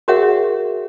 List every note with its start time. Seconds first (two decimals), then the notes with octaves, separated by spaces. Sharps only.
0.08 F#4 G#4 A#4 C#5 E5 F#5